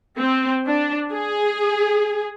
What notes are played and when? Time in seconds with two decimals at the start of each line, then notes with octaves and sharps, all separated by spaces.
0.20 C4
0.67 D4
1.12 G#4